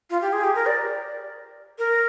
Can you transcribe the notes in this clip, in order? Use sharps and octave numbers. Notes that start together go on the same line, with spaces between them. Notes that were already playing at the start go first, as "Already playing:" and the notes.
F4
G4
G#4
G4
A#4
D5
A#4